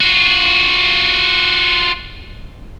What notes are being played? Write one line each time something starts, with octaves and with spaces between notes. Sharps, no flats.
F4 F#4